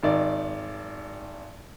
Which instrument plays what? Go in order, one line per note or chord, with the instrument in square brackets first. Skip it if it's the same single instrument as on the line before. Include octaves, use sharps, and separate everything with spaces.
[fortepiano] G#1 D#3 D5